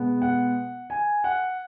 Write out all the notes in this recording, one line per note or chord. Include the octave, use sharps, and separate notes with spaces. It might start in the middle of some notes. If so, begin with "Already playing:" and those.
Already playing: B2 G#3 B3
F#5
G#5
F#5